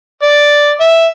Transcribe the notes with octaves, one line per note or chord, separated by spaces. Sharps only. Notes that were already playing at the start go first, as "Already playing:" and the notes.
D5
E5